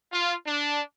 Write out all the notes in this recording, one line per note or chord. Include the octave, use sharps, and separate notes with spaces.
F4
D4